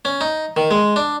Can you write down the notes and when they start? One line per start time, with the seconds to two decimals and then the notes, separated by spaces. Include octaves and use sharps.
0.05 C#4
0.21 D#4
0.57 D#3
0.71 G#3
0.96 D4